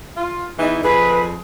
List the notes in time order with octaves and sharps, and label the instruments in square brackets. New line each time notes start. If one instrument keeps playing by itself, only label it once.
[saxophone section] F4
E2 E3 D#4
[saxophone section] F2 G#4 [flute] B4